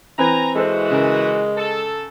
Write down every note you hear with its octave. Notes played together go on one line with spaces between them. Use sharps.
E3 C4 B4 G#5 A#5
E3 G#3 F#4 A4 C5
C#3 A#4
A4